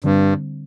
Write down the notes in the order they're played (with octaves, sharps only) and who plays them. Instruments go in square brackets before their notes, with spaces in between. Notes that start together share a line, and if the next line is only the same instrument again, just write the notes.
[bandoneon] G2 [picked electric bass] D3 G3 C4